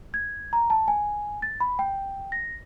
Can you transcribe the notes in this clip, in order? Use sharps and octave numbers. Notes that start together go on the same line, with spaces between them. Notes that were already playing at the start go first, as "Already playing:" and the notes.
G#6
A#5
A5
G#5
A6
B5
G5
A#6